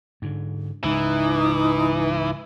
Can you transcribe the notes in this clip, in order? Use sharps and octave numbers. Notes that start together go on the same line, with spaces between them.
G#2 D3
C#2 G#2 E3 D#4